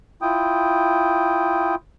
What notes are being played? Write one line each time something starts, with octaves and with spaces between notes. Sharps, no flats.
E4 F4 G5 D#6